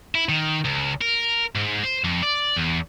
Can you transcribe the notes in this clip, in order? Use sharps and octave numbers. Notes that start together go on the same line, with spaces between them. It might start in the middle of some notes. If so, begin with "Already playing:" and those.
E4
D#3
C#2
A#4
G#2
C5
F2
D5
E2